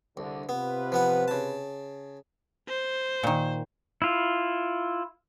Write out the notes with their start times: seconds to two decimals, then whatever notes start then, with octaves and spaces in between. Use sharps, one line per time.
0.17 C2 D3
0.49 C3 B3 F4 B4
0.92 F3 B3 F#5
1.28 C#3 A5
2.68 C5
3.23 A#2 D#3
4.02 E4 F4